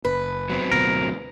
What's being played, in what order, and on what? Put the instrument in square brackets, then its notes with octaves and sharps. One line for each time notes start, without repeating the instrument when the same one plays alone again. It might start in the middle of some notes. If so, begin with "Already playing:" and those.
[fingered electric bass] F#1 [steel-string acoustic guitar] B4
[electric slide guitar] F#3 B3 C4
[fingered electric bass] D2 B2 [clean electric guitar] A#4